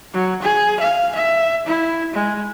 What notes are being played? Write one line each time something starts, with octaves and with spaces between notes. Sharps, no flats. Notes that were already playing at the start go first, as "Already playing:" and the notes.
F#3
G#4
F5
E5
E4
G#3